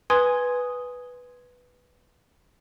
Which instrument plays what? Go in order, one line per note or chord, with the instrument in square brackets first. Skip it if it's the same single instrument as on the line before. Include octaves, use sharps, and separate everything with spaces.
[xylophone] B4 G#5 C6 D#6 G#6